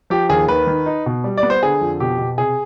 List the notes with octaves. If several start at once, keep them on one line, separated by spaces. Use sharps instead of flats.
F3 G4
D#2 G#4
D#3 B4
D#3
D#4
B2
G3
D5
B3
C5
D3 G#4
F2
B2 G4
B2
C3 G#4